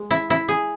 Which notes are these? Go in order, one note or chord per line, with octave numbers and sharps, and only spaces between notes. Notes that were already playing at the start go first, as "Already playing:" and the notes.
Already playing: G#3
E4
E4
G#4